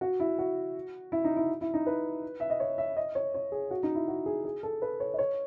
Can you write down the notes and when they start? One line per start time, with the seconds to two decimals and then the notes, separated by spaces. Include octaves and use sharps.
0.01 F#4
0.20 E4
0.39 F#4
1.12 E4
1.24 D#4
1.37 E4
1.61 E4
1.74 D#4
1.86 B4
2.40 E5
2.50 D#5
2.60 C#5
2.78 E5
2.97 D#5
3.15 C#5
3.34 C#5
3.52 G#4
3.71 F#4
3.83 D#4
3.95 E4
4.08 F#4
4.26 G#4
4.45 G#4
4.63 A4
4.82 B4
5.00 C#5
5.14 D#5
5.18 C#5